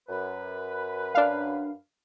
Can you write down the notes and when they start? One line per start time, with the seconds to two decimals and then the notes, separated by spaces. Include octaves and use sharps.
0.09 F#2 B4
1.15 D4 F5